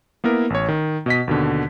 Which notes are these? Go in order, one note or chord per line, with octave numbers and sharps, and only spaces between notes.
A#3 B3 E4 A#4
A1 C#5
D#3
B2 D#5 B6
D#2 B2 D3